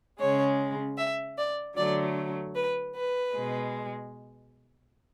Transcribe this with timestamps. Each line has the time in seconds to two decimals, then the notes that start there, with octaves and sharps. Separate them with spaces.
0.19 C#3 G#3 C#5
0.98 E5
1.37 D5
1.76 D3 F#3 A3 D5
2.55 B4
2.95 B4
3.33 B2 G#3